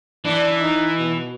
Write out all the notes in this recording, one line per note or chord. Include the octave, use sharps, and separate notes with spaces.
E3 D4
D#4
B2